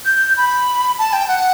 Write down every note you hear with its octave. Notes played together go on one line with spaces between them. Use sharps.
G6
B5
A5
G5
F#5